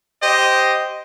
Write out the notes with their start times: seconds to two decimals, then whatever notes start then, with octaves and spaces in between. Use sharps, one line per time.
0.21 G4 C5 D#5